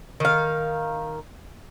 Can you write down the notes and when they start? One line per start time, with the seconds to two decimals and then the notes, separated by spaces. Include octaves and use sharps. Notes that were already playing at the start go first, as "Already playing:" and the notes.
0.20 D#3 F5